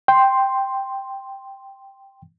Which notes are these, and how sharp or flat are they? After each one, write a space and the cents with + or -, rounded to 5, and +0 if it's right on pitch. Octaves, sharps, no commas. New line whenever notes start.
G5 +0 C6 +0